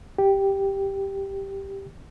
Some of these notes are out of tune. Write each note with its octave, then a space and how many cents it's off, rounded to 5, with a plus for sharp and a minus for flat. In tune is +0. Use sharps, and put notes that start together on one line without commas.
G4 +0